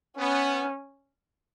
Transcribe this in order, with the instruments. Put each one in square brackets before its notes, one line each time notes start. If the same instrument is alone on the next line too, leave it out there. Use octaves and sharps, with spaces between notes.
[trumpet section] B3 [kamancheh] C#4